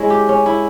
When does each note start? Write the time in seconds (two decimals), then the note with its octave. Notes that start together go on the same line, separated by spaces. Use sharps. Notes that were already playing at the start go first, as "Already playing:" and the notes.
Already playing: G#3 C#4 E4
0.10 G4
0.29 C#4
0.46 E4